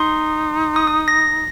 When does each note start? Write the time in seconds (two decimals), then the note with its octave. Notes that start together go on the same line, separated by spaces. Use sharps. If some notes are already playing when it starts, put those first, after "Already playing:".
Already playing: D#4 C6
0.76 D#6
0.87 D#6
1.08 A#6